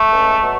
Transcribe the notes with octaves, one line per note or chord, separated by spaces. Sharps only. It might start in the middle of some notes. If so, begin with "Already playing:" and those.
Already playing: A3
C#2
B2 F#3